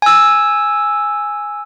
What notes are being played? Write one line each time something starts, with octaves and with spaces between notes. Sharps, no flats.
G#5 E6